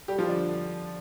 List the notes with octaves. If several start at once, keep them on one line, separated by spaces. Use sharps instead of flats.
G3 G4
F3 F4
D3 D4